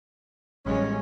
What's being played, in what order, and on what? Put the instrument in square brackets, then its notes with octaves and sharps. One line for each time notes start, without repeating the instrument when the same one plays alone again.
[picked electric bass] A1 G3 [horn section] G#3 C#4